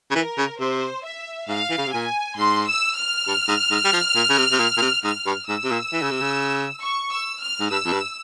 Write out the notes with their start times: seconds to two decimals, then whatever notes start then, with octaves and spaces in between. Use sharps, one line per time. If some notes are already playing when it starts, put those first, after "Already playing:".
0.11 C#3
0.15 E3 A#4
0.38 C#3
0.60 C3 C5
1.05 E5
1.48 G#2 F5
1.70 E3
1.78 C#3
1.86 C3
1.92 A#2 G#5
2.38 G#2 C6
2.66 E6
2.96 F6
3.27 G2
3.48 G#2
3.71 G#2
3.85 G3
3.92 F3
4.15 A#2
4.29 C#3
4.38 C3
4.52 C3
4.60 A#2
4.77 A#2
4.82 C3
5.04 G#2 F6
5.26 G2
5.48 G#2 E6
5.64 C3
5.71 A#2
5.93 E3
6.02 C#3
6.11 C3
6.21 C#3
6.82 C#6
7.12 E6
7.41 F6
7.60 G#2
7.71 G2 E6
7.85 F2
7.93 G2